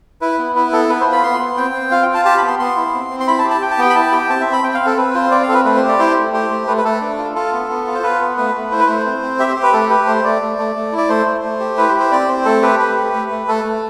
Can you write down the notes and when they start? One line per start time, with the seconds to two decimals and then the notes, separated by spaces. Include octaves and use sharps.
0.21 E4 B4
0.39 B3
0.55 E4 B4
0.73 B3 A4
0.89 B3 B4
1.01 C5
1.07 F4
1.12 B5
1.24 B3 C6
1.40 B3
1.57 C4 G5
1.74 C4
1.91 F4 F5
2.03 G5
2.08 F4
2.14 A5
2.25 G4 A5
2.37 B3 B5
2.48 C6
2.59 B3 C6
2.76 E4
2.93 C4
3.10 C4
3.20 C6
3.27 E4 B5
3.39 A5
3.45 G4
3.51 A5
3.62 G4 G5
3.71 A5
3.78 B3 G5
3.90 B5
3.95 E4 A5
4.12 G4 G5
4.29 C4 A5
4.41 E5
4.46 C4
4.53 B5
4.64 C4 G5
4.74 F5
4.81 C4
4.86 A4
4.97 C4 B4
5.14 F4 C5
5.31 C4 D5
5.43 F5
5.49 C4 A4
5.54 B4
5.65 A3 B4
5.77 C5
5.83 G4
5.88 D5
5.99 E4 C5
6.17 A3
6.33 G4 C5
6.51 A3
6.67 A3 B4
6.77 B4
6.85 A3 A4
7.01 D4
7.18 F4
7.35 F4 A4
7.53 B3
7.69 B3
7.87 F4
7.94 C5
8.03 F4 B4
8.21 B3
8.37 A3 B4
8.55 A3
8.71 E4 C5
8.80 B4
8.87 A3 C5
9.05 C4
9.22 C4
9.39 G4 E5
9.51 C5
9.56 G4
9.63 B4
9.73 A3 A4
9.90 G4 B4
10.07 A3 C5
10.24 A3 D5
10.42 A3
10.59 A3
10.76 A3
10.92 E4
10.98 D5
11.09 A3 C5
11.26 A3
11.43 A3
11.60 G4
11.78 E4 B4
11.88 C5
11.94 G4
12.00 C5
12.11 C4 D5
12.28 C4 C5
12.45 A3 A4
12.62 G4 B4
12.79 A3 B4
12.96 G4
13.14 A3
13.30 A3
13.48 A3 A4
13.64 A3